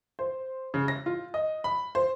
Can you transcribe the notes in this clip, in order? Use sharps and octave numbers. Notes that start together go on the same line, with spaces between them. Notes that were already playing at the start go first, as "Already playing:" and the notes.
C5
C#3
A#6
F4
D#5
B5
C5